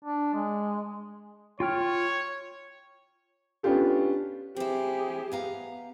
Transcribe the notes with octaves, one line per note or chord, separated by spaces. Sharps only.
D4
G#3
F4 C#5 G5 F6
B3 C#4 D4 F4 G4 A4
C4 E4 G4 G#4
B3 F5 A#5